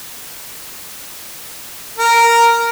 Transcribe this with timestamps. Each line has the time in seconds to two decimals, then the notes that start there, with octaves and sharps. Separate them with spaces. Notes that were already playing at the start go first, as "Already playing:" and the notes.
1.98 A#4